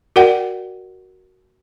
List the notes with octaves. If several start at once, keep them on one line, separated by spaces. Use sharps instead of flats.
F#4 A#4 D5 F#5 G5